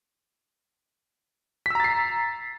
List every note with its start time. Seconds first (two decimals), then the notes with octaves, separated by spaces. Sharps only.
1.66 B6
1.70 E6
1.75 A#5
1.80 A6
1.84 C7